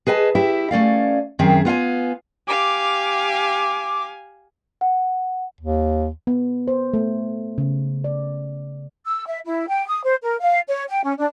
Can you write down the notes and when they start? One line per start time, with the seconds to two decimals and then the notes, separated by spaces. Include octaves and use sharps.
0.07 G#4 B4 D#5 G#5 A5
0.35 E4 G4 E5
0.71 A3 C#4 D5 F5
1.39 F#2 D#3 C4 G#4 E5
1.65 B3 F4 F5 G#5
2.48 G4 F5 G#5 D6
4.81 F#5
5.61 D#2
6.27 B3
6.68 C5
6.94 A3
7.58 C#3
8.04 D5
9.06 E6
9.26 E5
9.45 E4
9.68 G5
9.88 D#6
10.04 C5
10.22 A#4
10.41 F5
10.68 C#5
10.89 G5
11.03 C#4
11.18 D4